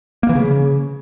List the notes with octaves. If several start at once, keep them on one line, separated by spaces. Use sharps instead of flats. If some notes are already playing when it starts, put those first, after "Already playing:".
A#3
E3
C#3